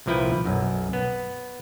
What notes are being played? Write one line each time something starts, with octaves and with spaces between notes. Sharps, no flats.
C2 A#2 F3 E4 B4 G5
B1 F#2
B3